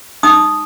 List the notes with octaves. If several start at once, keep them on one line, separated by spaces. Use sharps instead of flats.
D#4 D#6